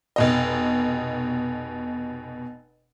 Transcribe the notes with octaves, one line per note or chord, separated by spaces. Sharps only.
F1 B2 D#5